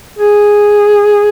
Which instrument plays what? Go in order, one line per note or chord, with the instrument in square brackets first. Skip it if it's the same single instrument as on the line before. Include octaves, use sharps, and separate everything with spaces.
[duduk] G#4